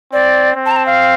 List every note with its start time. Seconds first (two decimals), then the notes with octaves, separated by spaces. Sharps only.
0.13 C4 D5
0.55 C4
0.66 A5
0.71 A#5
0.76 A5
0.86 F5